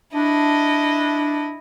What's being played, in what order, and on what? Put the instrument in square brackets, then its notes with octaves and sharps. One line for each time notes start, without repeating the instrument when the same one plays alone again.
[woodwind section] D4 [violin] E4 D#5